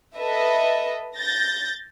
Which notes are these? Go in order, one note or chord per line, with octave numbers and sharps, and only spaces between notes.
A4 B4 D#5 E5
G6 A6 A#6